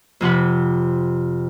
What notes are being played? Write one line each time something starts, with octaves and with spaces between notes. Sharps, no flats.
F2 C3 F#5 B5